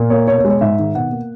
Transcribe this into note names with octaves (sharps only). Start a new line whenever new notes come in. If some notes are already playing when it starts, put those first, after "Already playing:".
Already playing: A#2
A#3 C#5
B2 C#5
C#5
G#3
C#5
G#2 E5
D#3
B2 F#5
A#3